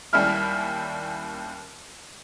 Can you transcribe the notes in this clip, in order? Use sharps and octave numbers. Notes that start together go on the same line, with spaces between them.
D#2 G3 C#4 E4 F6